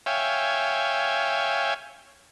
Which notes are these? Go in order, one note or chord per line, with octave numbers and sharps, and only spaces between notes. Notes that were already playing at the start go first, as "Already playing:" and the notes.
C#5 E5 F5 G5 G#5